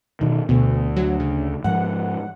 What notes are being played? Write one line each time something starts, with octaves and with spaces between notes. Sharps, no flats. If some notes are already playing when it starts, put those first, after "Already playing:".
B2 D#3
D2 B2 D3
F#3
C#3
G#2 F3 F#5